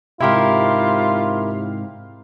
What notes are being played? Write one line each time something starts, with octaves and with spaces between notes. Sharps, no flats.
G#2 C3 E4 F4 G4 A#4